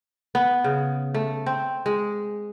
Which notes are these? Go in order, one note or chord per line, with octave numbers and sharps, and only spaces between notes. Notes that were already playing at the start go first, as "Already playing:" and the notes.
B3
C#3
A3
C4
G#3